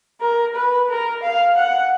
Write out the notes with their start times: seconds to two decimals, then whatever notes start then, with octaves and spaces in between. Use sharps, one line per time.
0.21 A#4
0.55 B4
0.89 A#4
1.23 F5
1.57 F#5